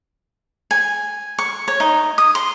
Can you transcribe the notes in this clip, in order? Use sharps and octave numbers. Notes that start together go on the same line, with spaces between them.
G#5
C#6
C#5
D#4
D#6
C6